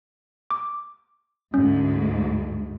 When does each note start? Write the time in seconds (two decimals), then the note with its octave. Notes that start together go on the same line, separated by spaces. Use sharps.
0.51 D6
1.54 D2 G#2 C#4